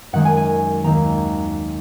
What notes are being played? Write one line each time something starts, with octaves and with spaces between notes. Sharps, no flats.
F#2 D#3 G#3 F#5
G#5
G#5
D#2 D#3 A#3 A#5